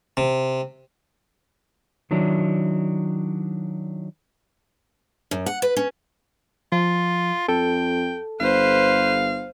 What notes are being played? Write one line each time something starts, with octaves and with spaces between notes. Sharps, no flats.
C3
D#3 F#3 D4 E4
F#2
F#5
B4
C#4
F3 F4
F2 A4 G5
G1 B4 C5 F5